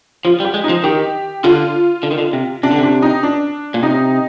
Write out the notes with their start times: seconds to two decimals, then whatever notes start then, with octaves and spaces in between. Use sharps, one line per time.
0.25 F3 F4
0.40 G3
0.44 G4
0.54 G#3
0.64 D#4
0.69 F3
0.84 D#3 G4
1.44 D3 F4
2.03 D3
2.11 D#3
2.18 D3
2.33 C3
2.63 C3 D4
2.71 D3
2.78 C3 D4
3.02 D#4
3.23 D4
3.74 A#2
3.82 C3 D#4